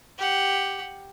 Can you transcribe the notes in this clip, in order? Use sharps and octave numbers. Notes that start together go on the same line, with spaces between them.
G4 F#5